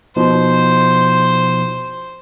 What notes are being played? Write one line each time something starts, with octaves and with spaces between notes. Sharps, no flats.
B2 F3 D#4 C5